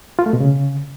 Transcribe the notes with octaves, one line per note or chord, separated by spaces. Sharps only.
F4
A3
B2
C#3